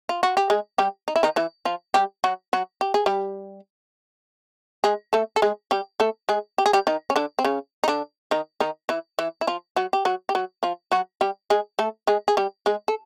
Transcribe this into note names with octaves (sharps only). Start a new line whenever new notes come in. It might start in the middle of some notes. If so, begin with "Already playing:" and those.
F4
F#4
G4
G#3 G#4
G3 G4
D#4
E4
D#3 D#4
E3 E4
F3 F4
G3 G4
F#3 F#4
F#3 F#4
G4
G#4
G3 G4
G#3 G#4
A3 A4
A4
G#3 G#4
G3 G4
A3 A4
G#3 G#4
G4
G#4
G3 G4
D#3 D#4
C#4
D3 D4
C4
C#3 C#4
D#4
D3 D4
D#3 D#4
D#3 D#4
E3 E4
E3 E4
E4
F3 F4
F#3 F#4
G4
F#3 F#4
G4
F#3 F#4
F3 F4
F#3 F#4
G3 G4
G#3 G#4
A3 A4
G#3 G#4
G#4
G3 G4
G#3 G#4
A4